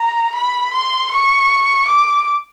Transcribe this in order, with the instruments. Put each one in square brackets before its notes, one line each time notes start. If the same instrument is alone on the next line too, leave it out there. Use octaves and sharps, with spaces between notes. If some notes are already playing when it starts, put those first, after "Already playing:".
Already playing: [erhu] A#5
B5
C6
C#6
D6